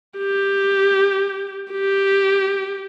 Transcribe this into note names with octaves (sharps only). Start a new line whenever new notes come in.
G4
G4